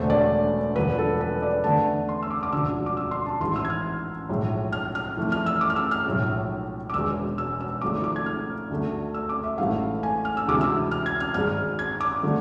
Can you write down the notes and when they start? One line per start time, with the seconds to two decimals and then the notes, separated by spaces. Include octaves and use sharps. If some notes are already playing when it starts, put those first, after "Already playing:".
Already playing: E1 E2 D3 A3 C5
0.10 D5
0.76 E1 E2 D3 F3 B4
0.98 A4
1.21 B4
1.42 D5
1.64 E2 D3 A3 A5
2.09 C6
2.23 E6
2.31 D6
2.43 D6
2.52 E1 D2 D3 F3 E6
2.86 D6
2.97 E6
3.11 C6
3.26 A5
3.40 A1 G#2 E3 C6
3.56 E6
3.65 G#6
3.70 F6
4.29 B1 A2 F3 G#3
4.73 F6
4.95 F6
5.17 F2 E3 A3
5.32 F6
5.46 E6
5.61 D6
5.70 F6
5.76 E6
5.91 F6
6.06 B1 A2 F3 G#3
6.90 D6
6.94 E1 E2 B2 G#3 E6
7.38 E6
7.61 E6
7.81 G#1 G#2 F3 A3 D6
8.04 D6
8.16 G#6
8.26 F6
8.70 D2 D3 A3
9.14 E6
9.29 D6
9.44 E5
9.58 A1 G#2 E3 A3 F5
10.03 G#5
10.25 F6
10.37 E6
10.47 D2 C3 E3 G#3 D6
10.61 E6
10.91 F6
11.06 G#6
11.20 F6
11.34 G#1 G#2 G#3 F6
11.79 G#6
12.01 D6
12.23 D3 F3 A3